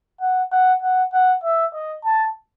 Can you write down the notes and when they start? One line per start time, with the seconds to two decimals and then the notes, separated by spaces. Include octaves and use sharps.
0.21 F#5
0.52 F#5
0.82 F#5
1.13 F#5
1.44 E5
1.74 D#5
2.05 A5